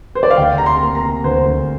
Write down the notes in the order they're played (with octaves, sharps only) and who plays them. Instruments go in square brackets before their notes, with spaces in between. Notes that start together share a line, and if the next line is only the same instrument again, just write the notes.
[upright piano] C5
D5
F5
[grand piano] D2 [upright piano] G5
[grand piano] C3 [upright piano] A#5
[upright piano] C6
[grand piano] A#3
[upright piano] A#5
[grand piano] C3
[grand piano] D2 [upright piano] C5
[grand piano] D2